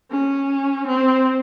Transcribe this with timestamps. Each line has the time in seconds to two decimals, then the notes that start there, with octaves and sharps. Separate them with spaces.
0.11 C#4
0.87 C4